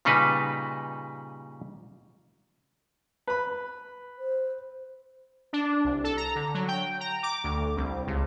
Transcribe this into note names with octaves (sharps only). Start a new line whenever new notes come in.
A#2 C#3 G3 D#4 B4
B4 B5
C5
D4
C2
A4
A#5
D3
F#3
G5
A#5
D6
D2
C2
C#2